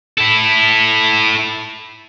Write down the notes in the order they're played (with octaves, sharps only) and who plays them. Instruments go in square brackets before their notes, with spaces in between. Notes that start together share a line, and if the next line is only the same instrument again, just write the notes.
[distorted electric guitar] E4 A4